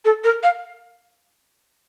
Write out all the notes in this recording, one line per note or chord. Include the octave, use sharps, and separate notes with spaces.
A4
A#4
F5